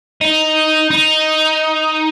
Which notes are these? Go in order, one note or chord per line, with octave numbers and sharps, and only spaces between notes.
D#4
D#4